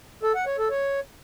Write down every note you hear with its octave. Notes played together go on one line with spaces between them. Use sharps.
A4
F#5
C#5
A4
C#5